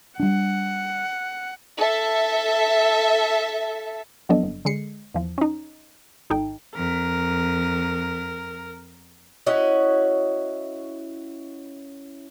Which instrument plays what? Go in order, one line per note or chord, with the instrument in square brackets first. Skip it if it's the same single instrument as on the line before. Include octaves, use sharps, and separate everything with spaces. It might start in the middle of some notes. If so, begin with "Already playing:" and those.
[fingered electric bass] G3 D4 [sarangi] F#5
[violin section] A4 E5
[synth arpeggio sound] F2 F#3 B3 D4 A4 D#5
G1
D3 G#3 C7 C#7
E2 F3
C#4 D#4
G#1 D#4 A4 G5
[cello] F2 [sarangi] A#4
[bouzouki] C#4 E4 F#4 D#5